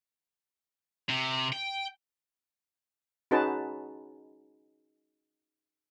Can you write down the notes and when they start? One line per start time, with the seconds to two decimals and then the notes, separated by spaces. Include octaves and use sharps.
1.09 C3
1.53 G5
3.31 C#4 D#4 F#4 G#4 B4 A5